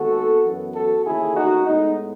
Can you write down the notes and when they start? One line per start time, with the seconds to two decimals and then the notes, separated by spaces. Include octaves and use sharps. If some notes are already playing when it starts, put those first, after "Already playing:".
Already playing: D#2 D#3 G#3 B3 F#4 A4
0.44 F#2 E3 B3
0.74 F#4 A4
1.05 D#2 C#3 E3 A3 E4 G#4
1.36 D#4 F#4
1.66 A2 G#3 B3 D#4